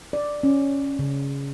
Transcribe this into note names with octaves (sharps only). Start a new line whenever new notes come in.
D5
C#4
C#3